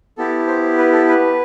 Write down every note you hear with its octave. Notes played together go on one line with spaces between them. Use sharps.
B3 E4 G4 A4
C5
B4
A4
B4